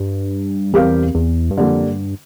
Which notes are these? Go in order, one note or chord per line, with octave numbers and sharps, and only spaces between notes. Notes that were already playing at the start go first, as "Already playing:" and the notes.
Already playing: G2
E2 G3 C4 G4 A#4 F5
E2
G2
F2 D3 G3 A#3
G2